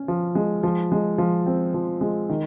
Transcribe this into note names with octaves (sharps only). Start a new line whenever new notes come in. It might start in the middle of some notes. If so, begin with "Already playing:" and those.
Already playing: C#4
F3
G#3
F3
G#3
F3
C4
F3
G#3
D#3